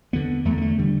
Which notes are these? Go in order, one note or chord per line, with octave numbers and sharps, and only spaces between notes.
E2 D3 B3
E2 D3 A3
B3
A3
D3 G3